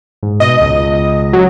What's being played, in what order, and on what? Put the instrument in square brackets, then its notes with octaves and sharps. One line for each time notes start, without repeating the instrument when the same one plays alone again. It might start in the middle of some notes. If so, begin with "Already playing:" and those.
[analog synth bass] G#2
[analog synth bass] B2 [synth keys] D#5
[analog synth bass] C#2
[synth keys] F#3